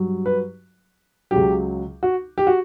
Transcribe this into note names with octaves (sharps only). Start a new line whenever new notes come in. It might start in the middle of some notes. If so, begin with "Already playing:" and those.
Already playing: G2 F#3
B4
C#2 C#3 F#3 G4
F#4
G4
F#4